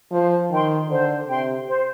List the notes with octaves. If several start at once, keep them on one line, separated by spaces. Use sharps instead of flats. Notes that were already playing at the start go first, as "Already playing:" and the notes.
F3 C5
D#3 G5 C6
D3 C5
C3 G5 C6
C5